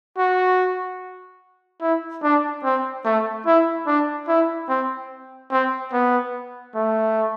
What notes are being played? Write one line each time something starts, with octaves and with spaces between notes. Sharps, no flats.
F#4
E4
D4
C4
A3
E4
D4
E4
C4
C4
B3
A3